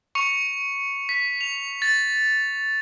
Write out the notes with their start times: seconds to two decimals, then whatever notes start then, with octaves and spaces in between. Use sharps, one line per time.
0.15 C#6 C#7 F7
1.09 B6
1.41 F7
1.82 A6